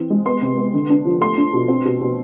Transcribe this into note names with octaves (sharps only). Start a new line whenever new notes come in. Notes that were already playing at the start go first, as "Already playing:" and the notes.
Already playing: E3 C4
G#3
B3 C6
C3
B3
D3
D4
F3
A3 C6
D4
B2
C4
B2
B2